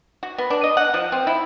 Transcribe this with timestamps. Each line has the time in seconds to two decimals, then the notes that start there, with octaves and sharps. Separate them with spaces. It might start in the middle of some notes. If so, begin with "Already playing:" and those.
0.23 F#4
0.38 B3
0.50 D4
0.64 D#5
0.77 F#5
0.94 F3
1.12 C4
1.27 E4